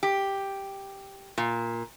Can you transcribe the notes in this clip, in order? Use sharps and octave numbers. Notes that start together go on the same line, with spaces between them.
G4
A#2